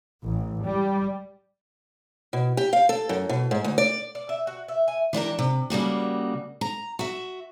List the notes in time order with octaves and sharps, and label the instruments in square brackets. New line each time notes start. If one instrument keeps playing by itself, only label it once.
[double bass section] A1
G3
[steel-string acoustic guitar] B2
G4
F5
A4
F#2
B2
G#2
D2
D5
[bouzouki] D5
E5
F#4
E5
G#5
[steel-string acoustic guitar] E3 D4 G4 A#4
C3
C#3 G3 A#3 F#4
A#5
F#4 E5